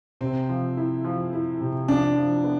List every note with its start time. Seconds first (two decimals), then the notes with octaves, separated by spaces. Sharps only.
0.21 C3 C4
0.49 F3
0.77 E4
1.05 F3
1.33 E4
1.61 C3
1.88 F3 D4
2.16 F3
2.44 B3